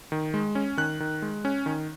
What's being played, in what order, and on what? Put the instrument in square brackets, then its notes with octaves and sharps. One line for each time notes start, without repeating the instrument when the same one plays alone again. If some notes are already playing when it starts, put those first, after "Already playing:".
[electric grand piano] D#3
G#3
C#4
D#3 F#6
D#3
G#3
C#4
D#3